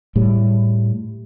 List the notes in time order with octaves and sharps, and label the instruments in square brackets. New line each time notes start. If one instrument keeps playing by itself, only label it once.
[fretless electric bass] A2 G3